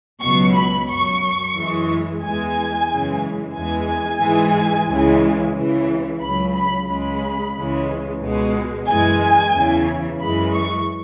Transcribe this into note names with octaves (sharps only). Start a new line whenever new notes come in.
C#2 B2 F#3 C#6
B5
F#2 F#3 C#6
F#2 E3 G#3
E2 E3 G#3 G#5
F#2 C#3 E3 G#3
E2 E3 G#3 G#5
G#2 E3 G#3
C#2 C#3 E3 G#3
C#2 C#3 E3
C#2 C#3 F#3 B5
B5
C#2 C#3 G#3 B5
C#2 C#3 E3 G#3
C#2 B2 G#3
F#2 E3 G#3 G#5
E2 C#3 E3
F#2 E3 G#3 B5
C#6